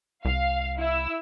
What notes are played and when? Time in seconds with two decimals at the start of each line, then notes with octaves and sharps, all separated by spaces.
0.25 C2 F5
0.79 E4 E6